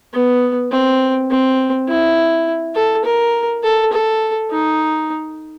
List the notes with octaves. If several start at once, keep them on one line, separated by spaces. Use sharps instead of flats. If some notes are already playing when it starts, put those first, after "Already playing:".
B3
C4
C4
E4
A4
A#4
A4
A4
D#4